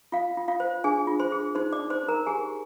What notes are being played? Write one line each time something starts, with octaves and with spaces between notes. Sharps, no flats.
F4 F5
F4
F4 F5
C5
D4 G#4 G#5
F4
C5 C6
G#4
D#4 C5 C6
D5 D6
D#4
C5 C6
D#4
A#4 A#5
G4 G#4 G#5